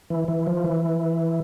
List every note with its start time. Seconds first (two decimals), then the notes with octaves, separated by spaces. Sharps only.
0.10 E3
0.28 E3
0.47 F3
0.64 E3